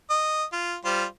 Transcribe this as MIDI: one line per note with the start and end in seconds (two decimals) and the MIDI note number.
0.10 0.44 75
0.53 0.76 65
0.85 1.04 55
0.85 1.04 65
0.85 1.04 72